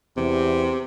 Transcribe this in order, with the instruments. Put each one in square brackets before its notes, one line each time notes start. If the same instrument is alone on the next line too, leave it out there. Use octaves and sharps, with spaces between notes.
[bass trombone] E2 [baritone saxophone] C3